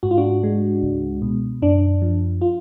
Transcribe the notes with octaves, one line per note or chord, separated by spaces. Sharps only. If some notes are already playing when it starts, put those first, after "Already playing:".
G#2 F#4
F4
D4 F#4
G#3
C#2
B2
F#2 D4
F3
F4